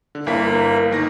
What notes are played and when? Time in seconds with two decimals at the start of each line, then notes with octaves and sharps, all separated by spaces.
0.15 D3
0.27 G1 A#3 E4 B6
0.91 G1 D#3 A#6